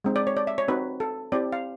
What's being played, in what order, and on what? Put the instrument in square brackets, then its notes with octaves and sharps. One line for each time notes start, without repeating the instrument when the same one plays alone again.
[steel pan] G#3 C4 D#4
D5
C#5
D5
E5
C#5
C4 D#4 F#4 B4
A4
C4 E4 G4 D5
F5